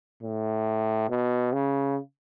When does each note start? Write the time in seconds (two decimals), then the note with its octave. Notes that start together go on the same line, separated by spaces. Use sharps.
0.23 A2
1.09 B2
1.53 C#3